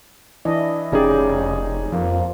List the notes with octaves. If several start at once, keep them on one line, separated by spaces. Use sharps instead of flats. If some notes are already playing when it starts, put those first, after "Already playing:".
E3 D4 E4 D#5
F1 C#3 C#4 D#4 G4 G#4 D5
F2 F3 A#3